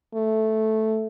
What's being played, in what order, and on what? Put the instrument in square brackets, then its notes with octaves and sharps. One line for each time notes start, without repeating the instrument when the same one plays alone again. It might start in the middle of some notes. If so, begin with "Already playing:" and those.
[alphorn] A3